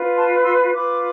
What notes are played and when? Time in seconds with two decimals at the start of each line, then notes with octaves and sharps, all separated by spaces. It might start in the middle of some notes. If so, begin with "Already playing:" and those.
Already playing: F4 B4
0.15 A5 C6
0.43 C6 E6
0.72 F4 B4 B5 D6